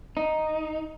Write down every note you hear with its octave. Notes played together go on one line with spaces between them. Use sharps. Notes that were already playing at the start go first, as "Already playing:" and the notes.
D#4